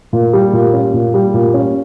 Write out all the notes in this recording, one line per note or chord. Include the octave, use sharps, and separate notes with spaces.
A#2
G3
A#2
C#4
A#2
G3
A#2
C#4